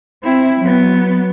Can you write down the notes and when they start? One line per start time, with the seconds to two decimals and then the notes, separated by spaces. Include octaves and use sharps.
0.22 C4 E4
0.61 F#3 B3